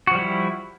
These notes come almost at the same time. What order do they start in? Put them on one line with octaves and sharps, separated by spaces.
F#4 F3 G3 E4